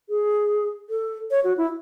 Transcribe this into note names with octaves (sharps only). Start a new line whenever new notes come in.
G#4
A4
C#5
F#4
E4